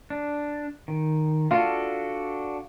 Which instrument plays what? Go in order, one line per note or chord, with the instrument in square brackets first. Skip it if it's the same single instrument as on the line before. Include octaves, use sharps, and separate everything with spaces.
[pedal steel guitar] D4
D#3
[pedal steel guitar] D4 F#4 A4 [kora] F4